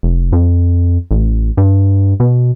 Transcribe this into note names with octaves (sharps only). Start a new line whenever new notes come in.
F1
F2
A1
G2
B2